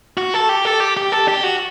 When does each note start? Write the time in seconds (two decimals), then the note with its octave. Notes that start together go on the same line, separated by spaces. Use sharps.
0.17 F#4
0.34 A4
0.49 G4
0.65 A4
0.80 G4
0.97 G4
1.12 A4
1.28 G4
1.43 F#4